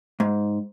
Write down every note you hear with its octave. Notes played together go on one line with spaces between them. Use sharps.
G#2